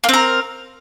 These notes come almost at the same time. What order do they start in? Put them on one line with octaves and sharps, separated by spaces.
A#3 C4 A#4